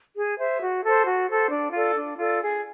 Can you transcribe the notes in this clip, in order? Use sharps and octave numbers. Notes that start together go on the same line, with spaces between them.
G#4
C5 E5
F#4
A4 C5
F#4
A4 C5
D4
F4 A4 D5
D4
F4 A4 D5
G#4